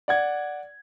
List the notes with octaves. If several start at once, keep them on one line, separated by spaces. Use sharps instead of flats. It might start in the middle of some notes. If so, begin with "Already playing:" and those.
D5 F#5 G#6